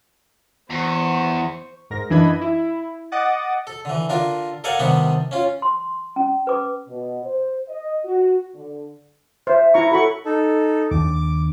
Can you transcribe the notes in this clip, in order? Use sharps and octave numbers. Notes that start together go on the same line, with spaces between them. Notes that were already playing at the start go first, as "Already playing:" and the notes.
E2 C5 C#6
G#2 A#4 A#6
F#2 E3 D4 D#5 B5 G#6
E4
D#5 F#5 D6 D#6 A6
A4
D3 E3
D3 D4 F4 A#4
A4 A#4 D5 F5 F#5 G#5
C3 D#3 G3 B3 D4 G4
C#4 F4
C6
C#4
B4 D6
B2
C5
D#5
F#4
D3
C5 E5
E4 A#5 C#6
F#4 A4 B5 C#6
D#4 A4
D#2 D4 D6